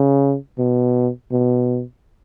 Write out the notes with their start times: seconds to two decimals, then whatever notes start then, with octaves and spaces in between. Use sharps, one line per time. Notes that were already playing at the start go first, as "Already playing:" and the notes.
Already playing: C#3
0.58 B2
1.32 B2